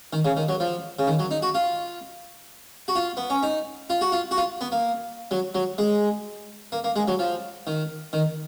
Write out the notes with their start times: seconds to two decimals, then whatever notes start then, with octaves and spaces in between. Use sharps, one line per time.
0.13 D#3
0.25 C#3
0.37 D#3
0.49 F#3
0.60 F3
0.99 C#3
1.07 D#3
1.19 F#3
1.31 D#4
1.42 F#4
1.54 F4
2.88 F#4
2.95 F4
3.17 B3
3.30 C#4
3.43 D#4
3.90 F4
4.01 F#4
4.12 F4
4.31 F#4
4.37 F4
4.61 B3
4.72 A#3
5.31 F#3
5.55 F#3
5.78 G#3
6.72 A#3
6.84 A#3
6.96 G#3
7.08 F#3
7.19 F3
7.67 D#3
8.13 D#3